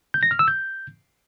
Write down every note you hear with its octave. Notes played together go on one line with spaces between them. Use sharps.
G6
A#6
F6
E6
G6